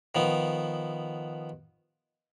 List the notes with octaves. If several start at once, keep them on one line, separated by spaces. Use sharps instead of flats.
D#3 F3 B3